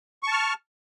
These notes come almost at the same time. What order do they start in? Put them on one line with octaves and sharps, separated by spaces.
C#6 A5 F6